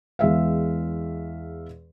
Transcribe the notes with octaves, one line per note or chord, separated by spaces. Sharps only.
E2 G#3 E5 F5